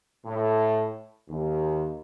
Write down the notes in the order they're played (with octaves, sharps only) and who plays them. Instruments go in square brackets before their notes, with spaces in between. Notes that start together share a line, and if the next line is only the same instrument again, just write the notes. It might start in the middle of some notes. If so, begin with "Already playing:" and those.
[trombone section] A2
D#2